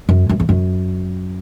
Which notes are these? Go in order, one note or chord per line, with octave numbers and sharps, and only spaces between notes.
F#2
F#2
E2
F#2